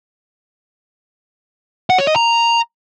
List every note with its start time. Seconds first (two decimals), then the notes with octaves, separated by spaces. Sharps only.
1.90 F#5
1.98 C#5
2.07 D#5
2.16 A#5